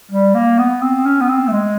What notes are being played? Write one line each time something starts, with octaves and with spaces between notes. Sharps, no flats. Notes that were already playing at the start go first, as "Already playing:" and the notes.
G3
A#3
B3
C4
C#4
B3
C4
A3
G#3